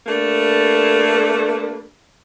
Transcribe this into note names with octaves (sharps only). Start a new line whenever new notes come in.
A3 A#3 D4 G4 A4 B4